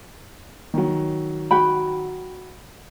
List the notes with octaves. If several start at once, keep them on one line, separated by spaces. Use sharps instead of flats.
D#3 F#3
F#4 G5 B5